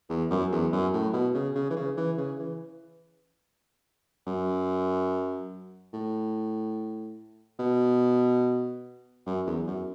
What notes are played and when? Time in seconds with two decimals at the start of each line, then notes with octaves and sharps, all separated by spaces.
0.09 E2
0.31 F#2
0.52 E2
0.73 F#2
0.94 A2
1.14 B2
1.35 C#3
1.55 C#3
1.71 E3
1.76 C#3
1.97 E3
2.18 C#3
2.39 E3
4.27 F#2
5.94 A2
7.60 B2
9.27 F#2
9.47 E2
9.68 F#2